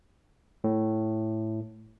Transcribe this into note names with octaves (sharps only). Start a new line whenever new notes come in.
A2